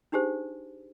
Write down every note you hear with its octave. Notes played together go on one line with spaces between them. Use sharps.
D4 D#4 G4 G#4 C5